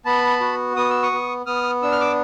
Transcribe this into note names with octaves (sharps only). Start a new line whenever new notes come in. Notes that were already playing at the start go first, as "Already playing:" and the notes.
B3 A5 B5
F#4
B3 D#6
E6
C#6 D#6
B3
B3 D#6 F6
D4 E6
F6
D6 E6